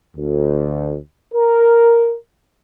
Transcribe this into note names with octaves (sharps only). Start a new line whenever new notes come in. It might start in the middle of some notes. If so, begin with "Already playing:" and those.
D2
A#4